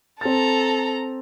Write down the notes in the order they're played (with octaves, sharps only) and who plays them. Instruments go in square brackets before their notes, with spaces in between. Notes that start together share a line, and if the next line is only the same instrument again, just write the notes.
[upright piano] C4 A6 [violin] A4 A#5